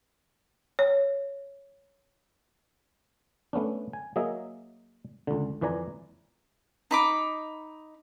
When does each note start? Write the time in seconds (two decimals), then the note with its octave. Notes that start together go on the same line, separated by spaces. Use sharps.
0.79 C#5
3.53 A3 B3 C#4 D4
3.93 G#5
4.16 F#3 A#3 G#4 D#5 E5
5.27 C#2 D3
5.61 F2 E3 B4 D5 G#5 A#5
6.91 D#4 B5 D6